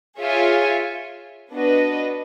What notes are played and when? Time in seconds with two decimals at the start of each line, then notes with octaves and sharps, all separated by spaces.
0.19 F4 G#4 C#5 E5 G#5
1.51 B3 D4 F#4 B4 D#5